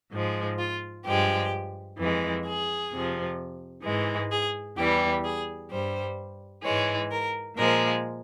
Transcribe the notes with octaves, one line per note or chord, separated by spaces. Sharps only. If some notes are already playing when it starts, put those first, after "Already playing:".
G#2 F3 G#3
F4
G2 F3 G#3 G4
F2 E3 G#3
G#4
F2 C3 F3
G#2 E3 G#3
G#4
E2 E3 G3 G4
G#4
G2 G3 C5
G#2 E3 G#3 C#5
A#4
A#2 F3 G#3 A#4